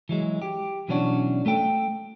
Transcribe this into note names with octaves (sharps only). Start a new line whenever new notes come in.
E3 F#3 G#3
G4
B2 E3 F#3 C#4 D4 F#4
A3 A4 G5